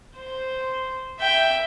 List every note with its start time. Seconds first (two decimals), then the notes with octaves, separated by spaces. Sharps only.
0.17 C5
1.19 E5 G5